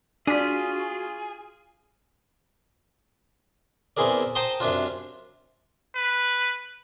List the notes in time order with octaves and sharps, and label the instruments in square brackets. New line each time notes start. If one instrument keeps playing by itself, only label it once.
[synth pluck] D4 B6 [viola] F4 [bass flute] F#4 [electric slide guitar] G#4
[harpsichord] E2 C4 E4 G#4 A#4 D5
C5 G5 A5 A#5 C6 D#6
F#2 C3 D4 F4
[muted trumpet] B4